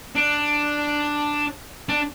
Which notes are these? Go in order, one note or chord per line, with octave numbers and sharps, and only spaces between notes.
D4
D4